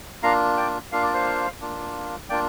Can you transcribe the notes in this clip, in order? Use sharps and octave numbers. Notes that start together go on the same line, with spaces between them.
A#3 D4 F4 F5 A#5
D5 G5
A#3 D4 F4 F5
D5
C5 F5
A#3 D4 F4
A#3 D4 F4 D5 G5